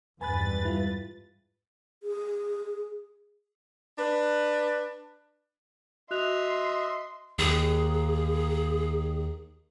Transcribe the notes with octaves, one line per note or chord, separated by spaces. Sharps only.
G#1 E2 G2 B4 G#5 B5 F#6 A6
G3 E4 F4
G#4
D4 B4
F#4 D#5 E5 C6 F#6 F7
D#2 G#4